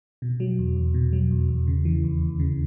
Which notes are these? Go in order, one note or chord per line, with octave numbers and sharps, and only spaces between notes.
B2
F#3
E2
E2
B2
F#3
E2
E2
C#3
E3
D#2
D#2
C#3